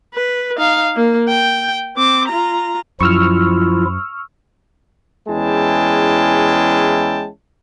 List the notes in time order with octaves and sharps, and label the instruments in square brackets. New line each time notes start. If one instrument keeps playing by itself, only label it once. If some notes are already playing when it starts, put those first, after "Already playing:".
[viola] B4
D#4 F5
A#3
G5
C4 D6
F4 A#5
[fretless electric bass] F#2 [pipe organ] F3 E4 F4 [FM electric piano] C#6 E6 F6
[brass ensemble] E2 G#3 C#4 E4 G5 A5